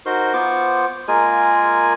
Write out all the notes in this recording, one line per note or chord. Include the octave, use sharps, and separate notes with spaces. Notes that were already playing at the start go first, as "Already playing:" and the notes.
D#4 F#4 A#4 C5 C6
B3 F4 C5 C#6 D6
G#3 A#3 F4 G#4 A#4 G#5